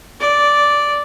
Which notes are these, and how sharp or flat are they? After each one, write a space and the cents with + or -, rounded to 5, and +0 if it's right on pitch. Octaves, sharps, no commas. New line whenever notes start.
D5 -5